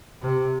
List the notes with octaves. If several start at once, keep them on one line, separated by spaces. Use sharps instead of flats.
C3